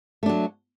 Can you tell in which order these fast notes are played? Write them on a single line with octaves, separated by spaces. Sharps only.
A3 D4 F#3